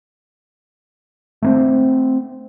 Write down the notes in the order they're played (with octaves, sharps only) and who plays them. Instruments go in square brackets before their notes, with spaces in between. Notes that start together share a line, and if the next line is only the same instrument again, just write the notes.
[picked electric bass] A3 A#3 C4